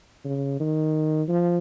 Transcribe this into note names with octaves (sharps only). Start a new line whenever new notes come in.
C#3
D#3
F3